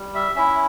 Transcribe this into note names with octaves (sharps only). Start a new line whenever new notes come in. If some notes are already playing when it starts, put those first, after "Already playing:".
Already playing: G3
E5
C#4 E4 E5